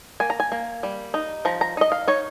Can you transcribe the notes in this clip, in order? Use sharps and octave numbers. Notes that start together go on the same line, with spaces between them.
A#3 G#5
A#5
G#5
A#3
G3
D#4
F3 A#5
A#5
D#4 D#5
F5
D#4 C#5